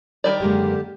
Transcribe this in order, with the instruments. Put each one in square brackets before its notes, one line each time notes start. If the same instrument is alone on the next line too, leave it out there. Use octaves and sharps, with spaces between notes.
[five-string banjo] D#3 G3 D5
[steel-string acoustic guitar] F#2 G#3 A#3 [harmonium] D3 G4